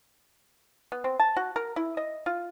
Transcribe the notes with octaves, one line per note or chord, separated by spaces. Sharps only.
B3
C4
A5
F#4
A#4
E4
D#5
F4